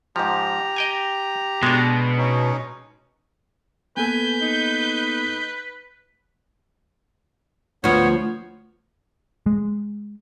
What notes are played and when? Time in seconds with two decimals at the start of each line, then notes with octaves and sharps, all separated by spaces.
0.16 G#2 F3 G4 A#5
0.76 D#5 G5 G#5
1.63 B2 G#3 D4
2.18 C#4 D#4
3.97 A#3 B3 A4 B4 G#5 G6
4.41 D#4
7.84 D2 F3 B3 C#5
9.46 G#3